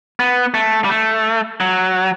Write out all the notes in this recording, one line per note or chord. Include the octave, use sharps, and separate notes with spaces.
B3
A3
G3
A3
F#3